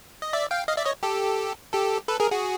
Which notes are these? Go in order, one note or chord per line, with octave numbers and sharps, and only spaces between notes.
D#5
D5 E5
F5 G5
D#5 F5
D5 E5
C#5 D#5
G4 A4
G4 A4
A4 B4
G#4 A#4
F#4 G#4